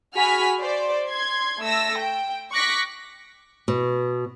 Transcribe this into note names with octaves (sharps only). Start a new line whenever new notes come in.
F#4 G#4 G#5 B5 F6 B6
C5 D5
C6 G#6
A3 E6 A#6
G5
C#6 D6 F#6 A#6 B6
B2